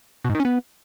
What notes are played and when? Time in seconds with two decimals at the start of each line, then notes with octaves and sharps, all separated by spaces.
0.25 B2
0.30 G#2
0.35 D#3
0.40 C#4
0.45 B3